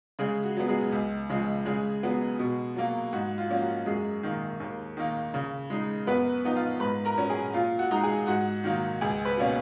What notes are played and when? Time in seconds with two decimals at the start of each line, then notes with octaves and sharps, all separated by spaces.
0.19 C#3 G#3 G#4
0.43 F#4
0.57 F#3 B3
0.68 G#3 G#4
0.92 C#2
1.30 C#3 F3 G#3
1.66 C#3 G#3 G#4
2.03 F#3 B3
2.39 B2
2.76 F#3 A#3
3.13 G#2 F#4
3.38 F4
3.50 F3 A#3 C#4
3.62 F#4
3.86 F#2 G#3 G#4
4.23 D#3 A#3
4.60 D#2
4.97 D#3 A#3
5.34 C#3
5.70 G#3 D#4
6.07 F#2 B3 B4
6.44 F3 B3 D#4
6.56 F4 F5
6.80 G#2 B4 B5
7.05 A#4 A#5
7.18 F#3 C#4
7.29 G#4 G#5
7.53 A#2 F4 F5
7.79 F#4 F#5
7.91 G#3 D#4 A#5
8.03 G#4 G#5
8.27 G#2 F#4 F#5
8.64 D#3 F#3 A#3
9.01 C#2 G#4 G#5
9.25 B4 B5
9.37 B2 A#3 C#4